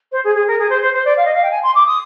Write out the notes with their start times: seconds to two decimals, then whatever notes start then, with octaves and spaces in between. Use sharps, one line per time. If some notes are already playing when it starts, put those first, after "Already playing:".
0.12 C5
0.24 G#4
0.35 G#4
0.48 A#4
0.59 G#4
0.70 C5
0.82 C5
0.94 C5
1.05 D5
1.17 F5
1.25 D#5
1.34 F5
1.43 G5
1.51 G#5
1.63 C6
1.75 D6
1.87 D#6